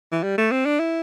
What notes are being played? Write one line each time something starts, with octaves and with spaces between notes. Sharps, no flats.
E3
G3
A3
C4
D4
E4